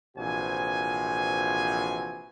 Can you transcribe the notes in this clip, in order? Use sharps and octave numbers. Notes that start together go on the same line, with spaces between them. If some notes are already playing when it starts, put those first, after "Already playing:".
A#1 C3 E3 F3 F#4 G#5